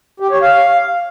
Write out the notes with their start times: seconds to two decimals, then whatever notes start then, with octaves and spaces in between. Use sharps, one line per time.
0.20 G4
0.31 C#5
0.42 F5